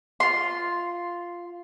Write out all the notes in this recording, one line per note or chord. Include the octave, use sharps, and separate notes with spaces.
F4 C6